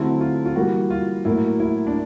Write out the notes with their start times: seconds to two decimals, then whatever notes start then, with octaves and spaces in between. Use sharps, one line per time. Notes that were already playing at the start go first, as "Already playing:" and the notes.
Already playing: D3 F#3 A3 C4 E4
0.21 F4
0.46 F4
0.56 E3 G3 A#3 F#4
0.90 F4
1.25 A2 F#3 A#3 E4
1.60 E4
1.87 D4